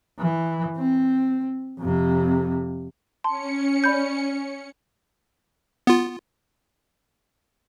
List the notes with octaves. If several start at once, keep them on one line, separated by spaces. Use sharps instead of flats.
E3
C4
F2 C3
C#4 A5 C6 C#7
D5 B5 G6
B3 F4